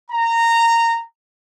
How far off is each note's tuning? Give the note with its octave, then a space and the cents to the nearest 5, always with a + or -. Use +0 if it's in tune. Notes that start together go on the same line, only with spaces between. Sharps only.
A#5 -15